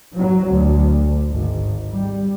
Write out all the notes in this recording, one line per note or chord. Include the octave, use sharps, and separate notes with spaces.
F#3
D2
G#1
G3